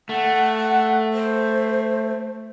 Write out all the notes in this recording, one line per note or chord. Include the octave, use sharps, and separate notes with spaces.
A3 F#5
C5